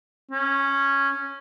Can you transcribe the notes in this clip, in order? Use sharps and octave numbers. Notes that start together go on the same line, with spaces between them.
C#4